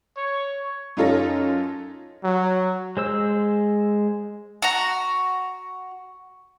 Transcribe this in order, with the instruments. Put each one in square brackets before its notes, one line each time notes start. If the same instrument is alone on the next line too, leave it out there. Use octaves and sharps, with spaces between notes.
[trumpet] C#5
[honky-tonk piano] F#2 D#4 F4 A4 C#5 A#6
[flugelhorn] F#3
[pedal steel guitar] G#3 C5 E6
[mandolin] F#4 A#5